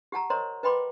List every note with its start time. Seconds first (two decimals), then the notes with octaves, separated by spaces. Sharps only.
0.12 G4 F#5 A5 A#5
0.30 A#4 C5 C#5 D#5 A#5 C6
0.63 B4 D#5 G5 B5 C6 D6